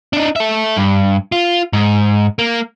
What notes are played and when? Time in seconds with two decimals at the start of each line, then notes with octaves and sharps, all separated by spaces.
0.13 D4 D#4
0.36 A4 E5
0.77 G2
1.32 F4
1.73 G#2
2.39 A#3